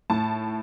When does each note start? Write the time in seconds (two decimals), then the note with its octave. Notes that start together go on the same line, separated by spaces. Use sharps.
0.10 A2 A5